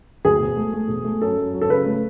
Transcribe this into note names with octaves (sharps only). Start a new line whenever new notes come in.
D2 G#4
E1
A3
A3
E1
A3
F#2 A4
F#2
F#3
A4
C#3 B4
A3